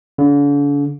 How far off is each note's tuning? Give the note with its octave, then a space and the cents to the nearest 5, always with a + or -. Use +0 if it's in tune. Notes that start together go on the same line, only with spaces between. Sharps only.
D3 -45